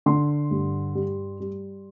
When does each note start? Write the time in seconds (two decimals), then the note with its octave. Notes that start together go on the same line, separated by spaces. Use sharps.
0.06 D3 C6
0.51 G2
0.95 G3
1.40 G3